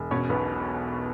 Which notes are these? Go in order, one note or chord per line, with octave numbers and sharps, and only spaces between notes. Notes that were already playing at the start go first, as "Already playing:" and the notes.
Already playing: E1
B2 C#4 C#5
B1 B3 B4